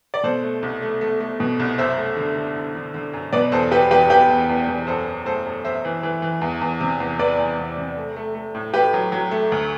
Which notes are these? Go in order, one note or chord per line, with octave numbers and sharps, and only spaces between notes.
D5
B2 A4 C5
A3
C2
A3
A3
A3
B2
C2
F#2 C5 E5
A3
D3
D3
D3
D3
D3
F#2
B2 B4 D5
E2 A4 C5
G3 G4 B4
E2 G4 B4
E2 G4 B4
E2
E2
E2
F#2 A4 C5
F#2
A3 A4 C5
F#2
F#2 C5 E5
E3
E3
E3
E2
E2
C3
E2
E2 B4 D5
E2
E2
C3
A3
A3
A3
A2
A3 G4 B4
F#3
F#3
A3
D2